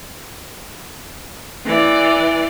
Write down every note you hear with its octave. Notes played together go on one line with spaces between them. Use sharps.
E3 D5